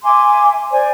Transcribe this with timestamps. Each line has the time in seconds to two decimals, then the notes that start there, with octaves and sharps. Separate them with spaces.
0.03 E5 G#5 C6 D6
0.71 C5 D5 G#5